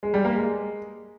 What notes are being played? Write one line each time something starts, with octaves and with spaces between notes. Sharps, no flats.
G#3
G3
A#3
G#3